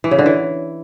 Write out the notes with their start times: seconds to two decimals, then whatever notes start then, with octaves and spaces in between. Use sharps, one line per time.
0.04 E3
0.11 C#3
0.19 D3
0.26 E3